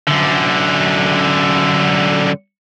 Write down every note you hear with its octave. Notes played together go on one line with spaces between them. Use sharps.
F#2 D3